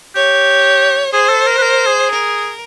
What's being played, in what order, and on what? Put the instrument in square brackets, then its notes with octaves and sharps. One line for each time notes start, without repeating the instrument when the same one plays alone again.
[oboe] G4 [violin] C#5
[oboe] G#4 [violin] C5
[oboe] A4
A#4
B4
A#4
G#4
[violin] A#4